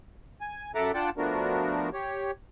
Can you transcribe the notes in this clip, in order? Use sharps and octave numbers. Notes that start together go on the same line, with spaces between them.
G#5
F#2 A4 E5 F#5 A#5 D6
D4 F4 D5 F#5 G5 A5
F3 A3 B3 D4 F#4 A#4
G4 C#5